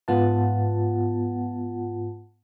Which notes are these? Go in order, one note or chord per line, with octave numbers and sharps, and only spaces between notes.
G#2 B3 F4 F#5 A5